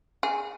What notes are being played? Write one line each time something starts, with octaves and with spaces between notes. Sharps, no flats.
G#4